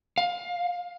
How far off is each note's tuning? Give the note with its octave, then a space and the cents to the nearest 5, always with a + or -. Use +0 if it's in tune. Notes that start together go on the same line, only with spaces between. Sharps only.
F5 +20